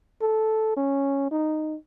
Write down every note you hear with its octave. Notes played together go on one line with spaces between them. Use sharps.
A4
C#4
D#4